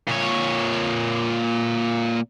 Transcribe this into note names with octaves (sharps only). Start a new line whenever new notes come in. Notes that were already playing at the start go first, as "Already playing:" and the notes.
A#2 C#5